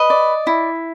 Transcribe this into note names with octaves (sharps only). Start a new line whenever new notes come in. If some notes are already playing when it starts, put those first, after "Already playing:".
Already playing: B4 D#5
D5
E4